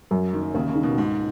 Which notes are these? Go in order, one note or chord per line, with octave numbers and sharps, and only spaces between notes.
F#2
F#1 D#3
D#2 C#3
C#3
D#3
B2
C#2 G#2